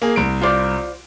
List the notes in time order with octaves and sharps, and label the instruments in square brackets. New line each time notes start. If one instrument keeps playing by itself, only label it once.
[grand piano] A#3 G#4
C2 D7
[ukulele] F4 C5 D5